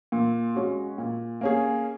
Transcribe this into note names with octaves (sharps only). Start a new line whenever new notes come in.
A#2
G#3 C#4 F#4
A#2
A#3 C#4 G#4